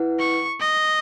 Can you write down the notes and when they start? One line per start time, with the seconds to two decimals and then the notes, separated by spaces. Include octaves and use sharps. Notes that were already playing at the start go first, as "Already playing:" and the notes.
Already playing: E4 B4 F#5
0.19 C#6
0.60 D#5